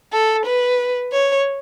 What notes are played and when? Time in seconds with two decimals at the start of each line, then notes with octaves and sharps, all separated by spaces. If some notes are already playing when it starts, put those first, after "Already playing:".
0.13 A4
0.46 B4
1.13 C#5